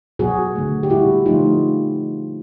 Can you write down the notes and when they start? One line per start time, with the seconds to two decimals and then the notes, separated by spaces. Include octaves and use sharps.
0.19 B2 F#3 B3 F#4 G#4
0.55 D3 F#3 A3
0.83 G4
0.90 A#2 G3 B3 E4 F#4
1.26 D3 F3 A3 D#4 F4